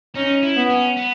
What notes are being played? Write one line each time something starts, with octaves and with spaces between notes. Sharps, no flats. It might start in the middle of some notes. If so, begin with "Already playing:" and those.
C#4 D#4
E4
B3
C#4
B3